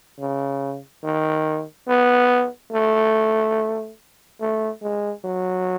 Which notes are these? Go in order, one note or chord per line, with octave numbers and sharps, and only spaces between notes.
C#3
D#3
B3
A3
A3
G#3
F#3